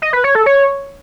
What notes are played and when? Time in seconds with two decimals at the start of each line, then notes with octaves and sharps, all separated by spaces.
0.02 D#5
0.13 B4
0.24 C#5
0.35 A4
0.46 C#5